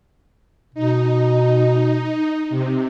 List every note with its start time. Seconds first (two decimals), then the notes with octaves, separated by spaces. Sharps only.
0.75 B2 D#4
2.50 C3